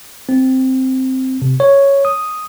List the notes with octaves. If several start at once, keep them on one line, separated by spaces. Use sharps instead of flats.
C4
C3
C#5
D#6